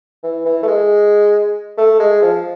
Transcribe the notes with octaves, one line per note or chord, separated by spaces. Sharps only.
E3
E3
A3
G#3
A3
G#3
F3